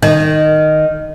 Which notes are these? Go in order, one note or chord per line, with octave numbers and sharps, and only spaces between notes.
D#3